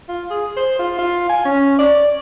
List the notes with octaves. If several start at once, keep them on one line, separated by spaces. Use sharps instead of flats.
F4
G#4
C5
F4
F4
G#5
C#4
D5